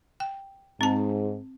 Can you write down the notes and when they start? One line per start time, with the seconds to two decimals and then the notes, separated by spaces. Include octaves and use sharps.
0.20 G5
0.81 G#2 C4 A5